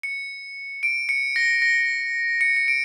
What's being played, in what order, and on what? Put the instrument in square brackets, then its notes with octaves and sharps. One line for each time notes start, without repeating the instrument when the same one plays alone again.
[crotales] C#7
D7
C#7
A#6
A#6
C#7
C#7
D7